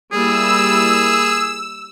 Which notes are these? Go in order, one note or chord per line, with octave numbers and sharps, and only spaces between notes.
G3 A#3 E4 G#4 E6